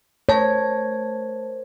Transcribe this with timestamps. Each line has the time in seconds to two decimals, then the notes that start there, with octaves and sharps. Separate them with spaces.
0.29 A3 A#4 C5 C#5 A5 A#6